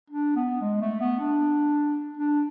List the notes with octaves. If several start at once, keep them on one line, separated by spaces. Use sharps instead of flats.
D4
B3
G#3
A3
B3
D4
D4